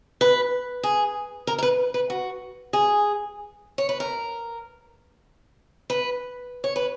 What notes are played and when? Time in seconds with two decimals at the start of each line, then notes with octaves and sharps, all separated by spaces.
0.21 B4
0.83 G#4
1.47 A#4
1.58 A#4
1.63 B4
1.94 B4
2.10 F#4
2.73 G#4
3.78 C#5
3.89 B4
4.00 A#4
5.90 B4
6.64 C#5
6.76 B4